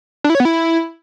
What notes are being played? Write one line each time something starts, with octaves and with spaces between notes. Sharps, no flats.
D4
E4
C#5
B3
E4